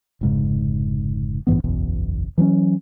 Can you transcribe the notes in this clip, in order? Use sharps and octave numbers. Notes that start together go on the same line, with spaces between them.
F1 G#2 C#3
A1 G2 E3 B3
F#1 B1 E2 B2
E3 F#3 C4 C#4